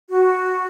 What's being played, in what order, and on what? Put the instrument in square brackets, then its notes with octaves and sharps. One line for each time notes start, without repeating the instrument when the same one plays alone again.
[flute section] F#4